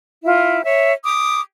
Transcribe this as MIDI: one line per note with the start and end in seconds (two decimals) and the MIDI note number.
0.24 0.64 64
0.24 0.64 65
0.64 0.92 73
0.64 0.92 76
1.04 1.41 86
1.04 1.41 87